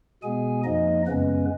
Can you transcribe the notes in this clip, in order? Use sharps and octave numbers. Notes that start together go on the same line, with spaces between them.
B2 G#3 B3 G#4 G#5
F2 F3 A#3 D#4 D#5
F#2 C#3 G#3 B3 C#4 B4